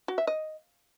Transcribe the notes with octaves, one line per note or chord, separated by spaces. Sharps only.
F#4
E5
D#5